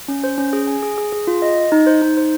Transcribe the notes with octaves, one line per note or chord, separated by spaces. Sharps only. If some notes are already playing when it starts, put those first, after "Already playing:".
C#4
C5
C#4
G#4
G#5
G#4
G#4
G#4
F4
D#5
D#5
D#4
C5
D#4
C5